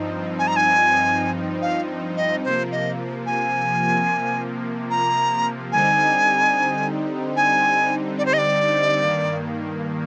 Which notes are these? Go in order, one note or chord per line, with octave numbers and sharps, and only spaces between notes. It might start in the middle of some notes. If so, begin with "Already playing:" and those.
Already playing: G2 F3 C4 D#4
G#5
A#5
G#5
F5
D#5
C3 F3 A#3 C5
D#5
G#5
A#5
D3 G3 C4 D#4 G#5
G#5
D5
C5
D#5
D5
G2 D#3 A#3